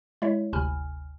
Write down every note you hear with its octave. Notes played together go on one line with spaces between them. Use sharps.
G#3 E4 C#5 E5
G1 D2 C3 G#5 B5 F6